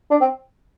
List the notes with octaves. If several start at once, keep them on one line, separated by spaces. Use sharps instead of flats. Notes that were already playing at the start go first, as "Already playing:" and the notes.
D4
C4